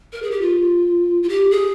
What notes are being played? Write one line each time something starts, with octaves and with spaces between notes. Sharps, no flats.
A#4
G#4
G4
F4
F4
G4
G#4